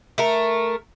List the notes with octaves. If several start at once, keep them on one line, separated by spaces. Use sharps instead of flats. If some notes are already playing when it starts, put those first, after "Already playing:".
A3 A#4